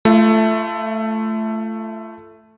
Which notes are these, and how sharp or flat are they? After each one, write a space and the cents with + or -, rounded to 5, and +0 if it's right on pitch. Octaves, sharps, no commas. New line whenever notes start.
A3 +0 F4 -35